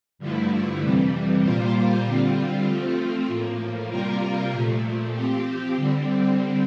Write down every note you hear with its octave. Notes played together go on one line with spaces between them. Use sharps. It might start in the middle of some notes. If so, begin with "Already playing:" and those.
G2 D3 F3 A3 E4
F2 C3 E3 G3
A#2 G3 A#3 F4 C5
D3 G3 C4 F4
F3 A3 C4 F4
A2 F3 A#3
C3 G3 A#3 F4 A#4
A#2 F3 A3
F3 C4 G4
D3 G3 C4